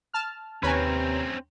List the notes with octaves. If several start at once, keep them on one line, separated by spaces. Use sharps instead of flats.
A5 F6
D#2 C3 C4 C#4 B4 C#5 G#5 A#5